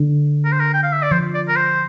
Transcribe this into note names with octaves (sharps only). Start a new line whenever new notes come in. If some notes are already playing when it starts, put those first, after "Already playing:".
Already playing: D3
A#4
C5
A#4
G5
F5
E5
D5
F3 C5
D5
A#4
C5